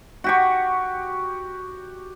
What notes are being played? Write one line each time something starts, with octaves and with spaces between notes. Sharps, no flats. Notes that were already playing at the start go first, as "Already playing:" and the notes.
F#4 G4 C#6